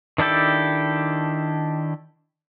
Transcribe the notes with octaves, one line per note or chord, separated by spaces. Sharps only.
D#3 D4 E4 G4 A4